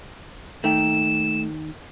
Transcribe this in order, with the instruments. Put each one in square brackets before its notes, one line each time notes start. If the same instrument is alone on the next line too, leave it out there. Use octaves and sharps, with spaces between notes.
[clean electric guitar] D#2 D#4 G5 [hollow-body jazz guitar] A3 [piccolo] E7